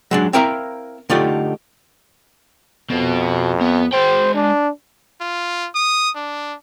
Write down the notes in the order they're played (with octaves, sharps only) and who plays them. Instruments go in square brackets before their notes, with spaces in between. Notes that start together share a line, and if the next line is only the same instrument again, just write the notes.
[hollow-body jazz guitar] F#3 G#3 D4
C4 E4 A#4 E5 F5 A#5
D3 A3 D#4 F4 G4
[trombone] F2 [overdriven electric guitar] B2
[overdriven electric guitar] B3
[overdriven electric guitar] G#3 G5 [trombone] C5
[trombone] D4
[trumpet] F4
D#6
D4